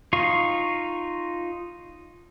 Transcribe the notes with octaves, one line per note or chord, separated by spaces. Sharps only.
D#4 F4 F5 C#6